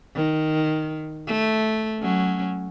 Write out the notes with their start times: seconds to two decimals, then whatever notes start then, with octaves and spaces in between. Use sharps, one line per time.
0.15 D#3
1.27 A3
2.00 F#3 C#4